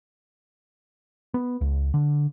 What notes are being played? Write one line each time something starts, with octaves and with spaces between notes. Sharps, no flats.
B3
C#2
D3